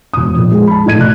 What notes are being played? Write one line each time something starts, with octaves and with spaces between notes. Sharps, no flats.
E1 D#6
F2 A#2
G#3
A5 B5
A2 A3 D#5 G#6 D#7
B2 A3 D5 F#6